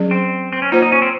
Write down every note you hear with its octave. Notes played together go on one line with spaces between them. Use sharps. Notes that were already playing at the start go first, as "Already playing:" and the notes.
Already playing: F#3 C#4 G#4
C4
C4
C#4
A#3 D#4 F4 C5
D#4
C#4
C4